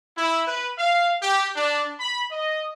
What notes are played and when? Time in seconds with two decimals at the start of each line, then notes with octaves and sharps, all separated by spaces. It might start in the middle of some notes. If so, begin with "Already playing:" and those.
0.17 E4
0.47 B4
0.79 F5
1.23 G4
1.56 D4
2.00 B5
2.32 D#5